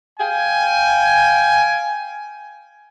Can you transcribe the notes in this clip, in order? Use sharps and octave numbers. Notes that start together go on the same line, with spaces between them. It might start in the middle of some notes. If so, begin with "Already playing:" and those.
F5 G5 G#5